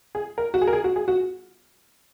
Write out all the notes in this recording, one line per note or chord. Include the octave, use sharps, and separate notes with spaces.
G#4
A#4
F#4
G#4
A#4
G#4
F#4
G#4
F#4